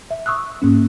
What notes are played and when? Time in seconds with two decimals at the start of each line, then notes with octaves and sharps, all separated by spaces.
0.11 E5
0.26 C#6 D#6 E6 F#6
0.62 G#2 A#3 C#4